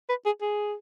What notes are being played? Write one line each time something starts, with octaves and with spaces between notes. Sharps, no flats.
B4
G#4
G#4